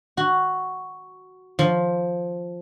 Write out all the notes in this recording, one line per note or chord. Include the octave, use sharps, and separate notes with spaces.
F#4
F3